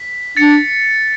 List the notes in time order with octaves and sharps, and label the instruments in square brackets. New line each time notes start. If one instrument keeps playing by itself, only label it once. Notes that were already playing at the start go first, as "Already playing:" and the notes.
Already playing: [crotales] B6
[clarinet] D4 [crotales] A6 C#7